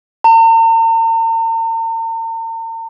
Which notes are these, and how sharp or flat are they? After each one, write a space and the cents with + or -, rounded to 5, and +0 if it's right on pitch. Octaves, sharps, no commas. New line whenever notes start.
A#5 -45